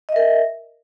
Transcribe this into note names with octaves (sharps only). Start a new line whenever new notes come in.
A#4 D#5 E5